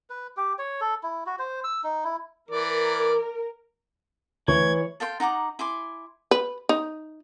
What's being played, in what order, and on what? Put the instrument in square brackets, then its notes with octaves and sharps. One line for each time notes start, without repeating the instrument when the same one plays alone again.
[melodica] B4
G4
C#5
A4
E4
F#4
C5
E6
D#4
E4
[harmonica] E3 D5 [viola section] A#4
[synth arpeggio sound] D2 [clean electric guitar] E3 [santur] C#5 [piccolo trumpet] G#6
[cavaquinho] A4 F5 G5 C6
D#4 F#5 A#5 D6
E4 G#5 C6 D6
[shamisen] B4
D#4